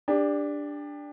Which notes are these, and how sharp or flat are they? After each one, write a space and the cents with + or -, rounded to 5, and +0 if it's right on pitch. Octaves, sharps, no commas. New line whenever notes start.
D4 +0 G4 +30